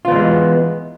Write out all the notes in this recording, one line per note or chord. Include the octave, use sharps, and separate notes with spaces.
E3 G#3 B3 F4